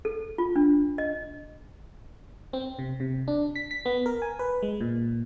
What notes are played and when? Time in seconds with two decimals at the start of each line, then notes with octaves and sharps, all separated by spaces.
0.05 A4
0.38 F4
0.56 D4
0.98 D#5
2.53 C4
2.79 C3
3.00 C3
3.28 D4
3.56 B6
3.71 B6
3.85 B3
4.06 A#4
4.22 G#5
4.39 B4
4.62 G#3
4.81 A#2